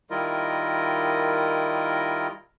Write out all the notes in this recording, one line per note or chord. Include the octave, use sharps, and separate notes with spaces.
D#3 G3 E4 F4 A#4 D#5